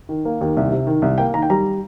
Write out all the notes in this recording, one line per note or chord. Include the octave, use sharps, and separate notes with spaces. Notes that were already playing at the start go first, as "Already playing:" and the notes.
D#3
A#3
D#2
C2
C3
D#3
C2
A#3 G5
D#3 A#5
G5
G3 A#5